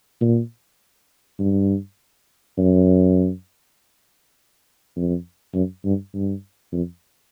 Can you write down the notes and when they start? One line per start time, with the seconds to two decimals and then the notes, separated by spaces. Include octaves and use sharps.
0.21 A#2
1.39 G2
2.58 F#2
4.96 F2
5.54 F#2
5.85 G2
6.14 G2
6.73 F2